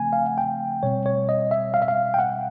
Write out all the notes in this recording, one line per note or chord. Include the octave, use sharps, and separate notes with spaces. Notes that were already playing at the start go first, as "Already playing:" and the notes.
Already playing: C#3 F3 A3 C4 G#5
F5
F#5
G5
B2 G3 C4 C#5
C#5
D#5
E5
F5
E5
F5
G5
F#5